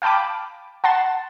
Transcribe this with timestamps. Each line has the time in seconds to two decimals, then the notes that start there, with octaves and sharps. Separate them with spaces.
0.02 F5 G5 A5 B5 D6
0.84 F#5 A5 C6 A6